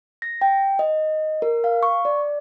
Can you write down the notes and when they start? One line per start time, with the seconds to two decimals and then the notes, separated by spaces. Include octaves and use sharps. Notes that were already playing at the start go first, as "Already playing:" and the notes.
0.22 A#6
0.41 G5
0.79 D#5
1.42 A#4
1.64 F5
1.83 C#6
2.05 D5